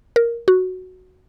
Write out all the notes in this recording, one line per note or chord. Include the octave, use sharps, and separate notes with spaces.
A#4
F#4